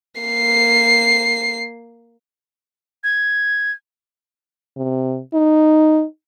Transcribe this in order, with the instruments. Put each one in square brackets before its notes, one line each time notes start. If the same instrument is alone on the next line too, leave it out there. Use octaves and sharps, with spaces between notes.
[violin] A#3 C7
[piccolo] G#6
[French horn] C3
D#4